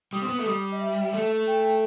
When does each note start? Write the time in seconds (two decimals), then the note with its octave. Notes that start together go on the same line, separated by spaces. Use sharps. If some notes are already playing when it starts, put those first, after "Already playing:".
0.13 G3 D#6
0.22 C4
0.29 B3
0.38 A3
0.46 G3
0.72 D#5
0.80 E5
1.13 A3
1.47 G5